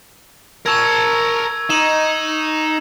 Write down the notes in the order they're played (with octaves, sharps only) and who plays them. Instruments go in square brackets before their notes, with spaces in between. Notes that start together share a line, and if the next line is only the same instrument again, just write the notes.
[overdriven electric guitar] A#4 A5 [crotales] C#6 E6 G#6
[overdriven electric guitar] D#4 [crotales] E7 F#7